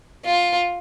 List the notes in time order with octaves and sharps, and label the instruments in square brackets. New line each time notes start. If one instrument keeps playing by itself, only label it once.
[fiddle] F4